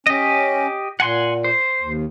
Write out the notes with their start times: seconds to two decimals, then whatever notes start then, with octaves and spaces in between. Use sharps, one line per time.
0.07 C#4 G4 D#5
1.00 A#2 F#5 G#5 C6
1.44 C5
1.81 D#2